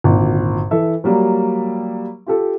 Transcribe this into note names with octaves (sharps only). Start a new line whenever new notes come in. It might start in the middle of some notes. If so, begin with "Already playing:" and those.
G#1 D2 A#2
E3 A4 E5
F#3 G3 A#3
F4 G4 A4